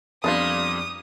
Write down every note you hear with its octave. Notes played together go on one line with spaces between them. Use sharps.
F2 A#2 G3 B3 D4 F4 D#6